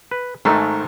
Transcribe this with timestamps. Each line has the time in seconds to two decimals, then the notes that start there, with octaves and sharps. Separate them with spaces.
0.11 B4
0.45 G#1 G#2 D#3 A3 A4 A#4